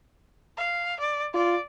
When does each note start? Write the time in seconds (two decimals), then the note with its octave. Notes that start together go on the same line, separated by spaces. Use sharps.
0.57 F5
1.00 D5
1.34 F4 D5